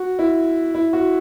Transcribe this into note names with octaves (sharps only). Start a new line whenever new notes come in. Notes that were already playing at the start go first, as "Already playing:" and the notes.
Already playing: F#4
E4
E4
F#4